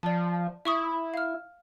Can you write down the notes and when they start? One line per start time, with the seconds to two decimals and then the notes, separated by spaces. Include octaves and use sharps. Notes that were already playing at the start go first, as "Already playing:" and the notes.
0.03 F3 D5 A5
0.65 E4 E5 C#6 D#6
1.14 F5 F6